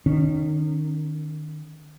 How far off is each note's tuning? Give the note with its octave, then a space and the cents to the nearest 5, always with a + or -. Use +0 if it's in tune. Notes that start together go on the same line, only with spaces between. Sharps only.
D#3 -25 C#4 +0